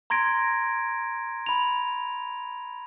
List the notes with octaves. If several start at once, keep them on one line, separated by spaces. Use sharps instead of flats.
A#5 C6 G#6 A#6 D7
B5 F7